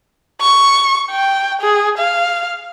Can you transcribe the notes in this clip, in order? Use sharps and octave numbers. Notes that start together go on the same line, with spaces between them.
C#6
G5
G#4
F5